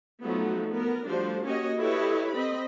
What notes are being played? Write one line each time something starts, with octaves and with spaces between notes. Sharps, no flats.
F3 F#3 A3 B3 D#4 F#4
B3 A#4
F3 G3 A3 D4 F#4 C5
A#3 C#4 F#4 G4 C#5 D#5
E4 G4 A4 B4 C#5 D#5
C4 D#5 B5